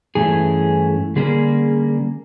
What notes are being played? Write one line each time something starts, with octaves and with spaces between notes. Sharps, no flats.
G2 E3 A3 C#4 E4 G#4
D3 G3 A#3 C#4 G#4